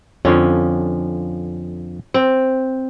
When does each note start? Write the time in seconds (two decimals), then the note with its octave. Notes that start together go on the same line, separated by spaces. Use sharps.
0.25 F2 D3 F3 C#4
2.14 C4